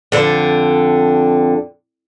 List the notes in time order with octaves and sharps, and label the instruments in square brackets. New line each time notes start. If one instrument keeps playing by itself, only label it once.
[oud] F2 D3